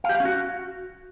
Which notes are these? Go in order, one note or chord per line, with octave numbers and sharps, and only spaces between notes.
F5
G4
F5
C#4
F#4